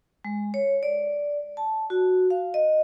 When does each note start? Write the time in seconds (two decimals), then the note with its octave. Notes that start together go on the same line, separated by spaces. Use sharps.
0.24 G#3
0.54 C#5
0.83 D5
1.57 A5
1.90 F#4
2.30 F5
2.54 D#5